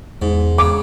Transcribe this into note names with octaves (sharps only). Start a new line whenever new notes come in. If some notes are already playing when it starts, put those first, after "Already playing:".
E2 G#2
C#3 D6